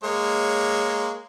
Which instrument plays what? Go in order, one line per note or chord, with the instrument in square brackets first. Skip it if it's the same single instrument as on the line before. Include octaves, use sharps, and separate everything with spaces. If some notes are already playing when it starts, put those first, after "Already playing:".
[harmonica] G#3 A#3 C#5